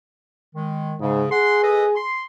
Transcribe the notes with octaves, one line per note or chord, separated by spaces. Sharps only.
D#3 G#3
G#2 C#3
G#4 F#5 C6
A4 B4 D#5
C6